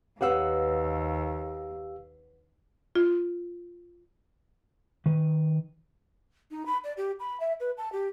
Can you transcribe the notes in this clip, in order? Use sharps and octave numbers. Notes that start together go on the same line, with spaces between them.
D#2 G4 B4 C#5 F5 F#5 E6
F4
D#3 B4
D#4
B5
D5
G4
B5
E5
B4
A5
G4